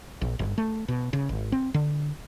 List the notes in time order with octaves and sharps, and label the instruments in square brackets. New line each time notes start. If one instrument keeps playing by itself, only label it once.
[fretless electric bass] A#1
G1
A3
B2
C#3
G#1
C4
D3